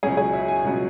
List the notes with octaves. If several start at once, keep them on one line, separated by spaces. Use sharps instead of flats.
C#2 B2 F#3 C#4 G#4
G#4
E5
G#5
C#2 B2 F#3 C#4